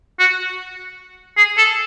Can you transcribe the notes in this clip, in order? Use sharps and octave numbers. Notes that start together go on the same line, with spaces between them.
F#4
G#4
A4